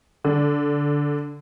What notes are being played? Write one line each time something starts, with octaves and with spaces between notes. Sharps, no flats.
D3